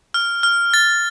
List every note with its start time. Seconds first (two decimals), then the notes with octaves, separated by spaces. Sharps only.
0.14 F6
0.43 F6
0.74 A6